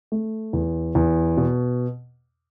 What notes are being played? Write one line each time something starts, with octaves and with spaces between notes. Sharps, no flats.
A3
E2
E2
B2